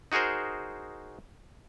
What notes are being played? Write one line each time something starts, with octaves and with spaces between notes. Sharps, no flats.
D#4 F#4 G#4 A#4 C5